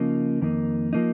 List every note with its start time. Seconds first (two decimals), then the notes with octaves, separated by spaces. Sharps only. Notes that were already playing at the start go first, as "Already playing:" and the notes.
Already playing: C#3 F3 A#3 D#4
0.41 F2 D#3 A#3 D#4
0.93 F3 A#3 D#4